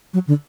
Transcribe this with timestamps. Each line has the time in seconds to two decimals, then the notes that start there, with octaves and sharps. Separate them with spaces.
0.14 F#3
0.27 D3